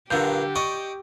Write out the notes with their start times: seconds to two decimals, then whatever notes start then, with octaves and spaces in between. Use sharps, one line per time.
0.11 G2 A#2 D3 F#3 G4 G6
0.56 D5 D#5 C#6